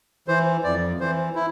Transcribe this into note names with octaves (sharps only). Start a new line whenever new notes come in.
E3 C5
F2 D5
E3 C5
E4